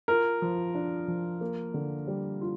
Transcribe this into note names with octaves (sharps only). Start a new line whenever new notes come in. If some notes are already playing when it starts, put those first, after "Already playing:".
F4 A#4
F3
D4
F3
A#3
D3
G3
F4